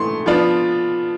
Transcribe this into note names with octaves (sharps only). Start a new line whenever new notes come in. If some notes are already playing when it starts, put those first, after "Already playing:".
Already playing: E3 A3 C6
F3 B3 D4 F4